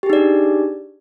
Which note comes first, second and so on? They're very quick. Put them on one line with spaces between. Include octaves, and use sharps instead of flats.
G4 G#4 D#4 D5 D4